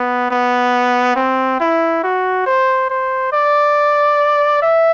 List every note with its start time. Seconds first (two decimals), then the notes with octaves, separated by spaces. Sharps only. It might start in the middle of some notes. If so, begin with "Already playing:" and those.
Already playing: B3
0.31 B3
1.16 C4
1.60 E4
2.04 F#4
2.46 C5
2.90 C5
3.33 D5
4.63 E5